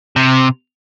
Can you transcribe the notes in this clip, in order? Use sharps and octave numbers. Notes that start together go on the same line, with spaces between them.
C3